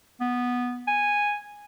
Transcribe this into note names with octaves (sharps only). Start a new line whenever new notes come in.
B3
G#5